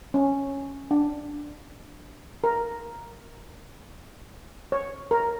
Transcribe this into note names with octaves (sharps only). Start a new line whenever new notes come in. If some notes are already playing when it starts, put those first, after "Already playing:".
C#4
D4
A#4
C#5
A#4